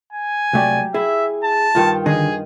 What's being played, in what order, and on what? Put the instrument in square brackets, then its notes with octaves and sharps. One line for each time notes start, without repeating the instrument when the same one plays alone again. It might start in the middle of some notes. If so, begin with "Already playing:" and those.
[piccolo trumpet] G#5
[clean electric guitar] C2 A3 D5 [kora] F#3 G4
[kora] E4 [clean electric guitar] G#4 [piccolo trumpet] E5
[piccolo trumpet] A5
[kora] G2 D#3 F4
[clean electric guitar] D3 D#3 [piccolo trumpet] G#4 [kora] D#5